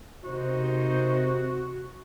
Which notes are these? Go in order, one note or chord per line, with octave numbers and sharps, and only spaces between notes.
C3 D#3 D#4 F#4 C5